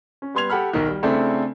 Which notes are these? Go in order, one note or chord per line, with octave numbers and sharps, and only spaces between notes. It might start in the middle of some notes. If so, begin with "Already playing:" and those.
C#4
G3 B3 C6 G#6 F7
G4 A4 F#5 B5 F6
B1 D#3
G3
C#3 A3 C4 D4 E4 A4